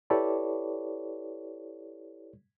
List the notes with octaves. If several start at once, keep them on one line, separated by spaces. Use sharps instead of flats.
E4 G4 A4 B4 C#5 D5